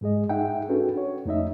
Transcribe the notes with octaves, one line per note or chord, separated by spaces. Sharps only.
G#2 G#3 G#4 D#5
D#4 G#4 E5 F#5 G5
C#4 D4 F#4 A4 B4
C#5
F2 A3 D#4 D#5 E5